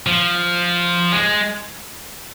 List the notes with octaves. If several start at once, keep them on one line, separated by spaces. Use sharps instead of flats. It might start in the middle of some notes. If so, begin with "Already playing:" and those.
F3
G#3